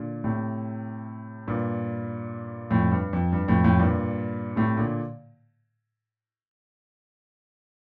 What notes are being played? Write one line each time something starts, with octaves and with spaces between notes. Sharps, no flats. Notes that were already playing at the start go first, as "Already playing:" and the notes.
Already playing: A#2 D3
A2 C3
G2 A#2
F2 A2
G2
F2
G2
F2 A2
F2 A2
G2 A#2
A2 C3
A#2 D3